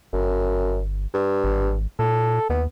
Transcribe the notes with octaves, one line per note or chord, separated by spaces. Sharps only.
G1 F#2
G2
G#1
A#2 A4
D#2 B3